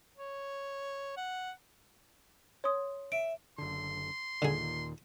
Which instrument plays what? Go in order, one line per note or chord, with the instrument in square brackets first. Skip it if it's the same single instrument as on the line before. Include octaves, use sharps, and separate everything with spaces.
[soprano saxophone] C#5
F#5
[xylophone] C#5 C6 D#6
[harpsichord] E5 [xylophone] D7
[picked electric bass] F#1 D3 [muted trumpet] C6
[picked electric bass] D#2 A#2 D#3 [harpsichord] D3 G#4